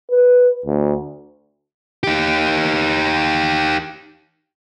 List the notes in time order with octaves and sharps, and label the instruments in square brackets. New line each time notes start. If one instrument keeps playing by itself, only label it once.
[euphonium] B4
D2
[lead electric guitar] D#4 G4